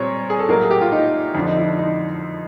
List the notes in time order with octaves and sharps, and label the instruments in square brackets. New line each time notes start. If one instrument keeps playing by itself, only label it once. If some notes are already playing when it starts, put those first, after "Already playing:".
Already playing: [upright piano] A#2 G3 C4 [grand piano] C5 C#5
[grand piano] G#4
A4
[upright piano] A2 F#3 A#3 [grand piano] A#4
[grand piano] G#4
G4
F4
D#4
[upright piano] F2 D3 F3 [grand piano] D4
[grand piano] D#4
E4
D4
D#4